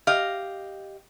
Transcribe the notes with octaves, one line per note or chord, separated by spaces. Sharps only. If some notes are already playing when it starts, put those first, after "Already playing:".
G4 D#5 F5